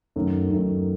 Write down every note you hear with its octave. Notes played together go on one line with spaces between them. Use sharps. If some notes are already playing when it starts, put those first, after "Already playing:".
F#2 D#3 A3
F#2 D#3 A3